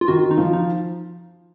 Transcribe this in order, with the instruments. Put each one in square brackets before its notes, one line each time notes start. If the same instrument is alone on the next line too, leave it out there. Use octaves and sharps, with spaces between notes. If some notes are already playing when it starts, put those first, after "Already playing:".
[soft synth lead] F4
[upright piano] D#3 [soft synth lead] F#4
[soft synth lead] D#4
[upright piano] F3
[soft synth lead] D#4